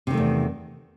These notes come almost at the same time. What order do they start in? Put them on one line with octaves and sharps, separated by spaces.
C3 D#3 A3 E2